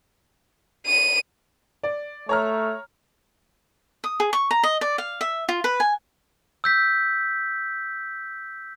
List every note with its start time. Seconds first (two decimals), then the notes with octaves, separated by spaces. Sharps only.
0.86 D#7
1.83 D5
2.29 A3 C#5 A#5 F6
4.04 D#6
4.20 G#4
4.33 C#6
4.51 A#5
4.63 D#5
4.81 D5
4.98 F5
5.21 E5
5.49 F4
5.64 B4
5.80 G#5
6.64 E6 G6 B6